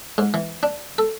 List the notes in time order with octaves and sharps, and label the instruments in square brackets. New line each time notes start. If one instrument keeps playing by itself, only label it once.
[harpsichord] G#2
E3
D4
A4